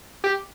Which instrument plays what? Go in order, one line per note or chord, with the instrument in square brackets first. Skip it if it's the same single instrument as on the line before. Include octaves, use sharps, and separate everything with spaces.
[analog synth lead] G4